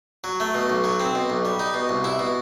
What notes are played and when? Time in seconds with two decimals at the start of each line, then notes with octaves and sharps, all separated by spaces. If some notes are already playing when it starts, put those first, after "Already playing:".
0.24 F#3
0.40 A3
0.54 B2
0.70 B1
0.84 F#3
1.00 C4
1.15 B2
1.30 B1
1.45 G3
1.59 D#4
1.74 B2
1.89 C2
2.04 E4
2.19 B2